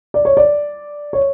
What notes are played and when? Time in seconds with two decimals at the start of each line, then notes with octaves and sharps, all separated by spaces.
0.14 D5
0.25 C#5
0.37 D5
1.13 C#5